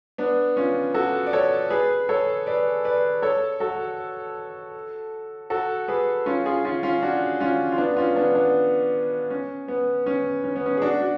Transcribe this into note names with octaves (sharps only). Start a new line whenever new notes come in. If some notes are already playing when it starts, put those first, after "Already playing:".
B3 D4
C#4 F4
F#4 A4
D5
A4 C#5
G#4 B4
A4 C#5
B4 D5
B4 D5
A4 C#5
F#4 A4
F#4 A4
G#4 B4
C#4 F4
F4 G#4
C#4 F4
C#4 F4
D4 F#4
C#4 F4
F4
B3 D4
C#4 F4
B3 D4
B3 D4
C#4
B3
C#4
C#4
B3
C#4
G#4
D4 F#4
D4 F#4